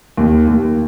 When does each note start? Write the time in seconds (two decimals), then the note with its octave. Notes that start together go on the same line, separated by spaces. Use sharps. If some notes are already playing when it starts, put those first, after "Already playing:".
0.18 D#2
0.48 D#2